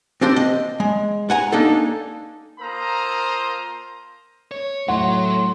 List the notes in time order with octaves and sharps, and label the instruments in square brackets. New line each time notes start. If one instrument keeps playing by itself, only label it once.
[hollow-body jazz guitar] C4 D4 G4 C5
D#5
G#3
F#5 G#5 A#5
A#3 D4 D#4 A4
[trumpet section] A#3 F4 A4 C5 A#5 D#6
[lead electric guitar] C#5
[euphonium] A2 [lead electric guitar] F#3 [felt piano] F#5 [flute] C6